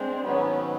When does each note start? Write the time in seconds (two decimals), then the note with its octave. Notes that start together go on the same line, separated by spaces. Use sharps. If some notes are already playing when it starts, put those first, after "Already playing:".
Already playing: G#3 C4 D4
0.24 G#2 D#3 F#3 B3 C#4